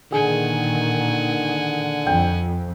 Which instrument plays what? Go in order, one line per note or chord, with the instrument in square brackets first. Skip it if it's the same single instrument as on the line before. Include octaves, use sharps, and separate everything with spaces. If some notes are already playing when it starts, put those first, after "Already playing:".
[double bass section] A#2 D#3 [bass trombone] D3 [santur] G#4 [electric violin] F#5 G#5
[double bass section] F2 [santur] G5